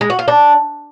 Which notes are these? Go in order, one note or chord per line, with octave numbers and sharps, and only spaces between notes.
G#3
F#4
F4
D4